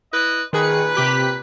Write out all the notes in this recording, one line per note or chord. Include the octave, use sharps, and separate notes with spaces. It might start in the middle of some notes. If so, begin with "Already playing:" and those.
E4 B4 D#5
A#2 D#3 G#4 B4 C#7
C3 G4 B6